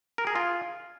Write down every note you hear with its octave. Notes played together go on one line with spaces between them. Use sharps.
A#4
G#4
F4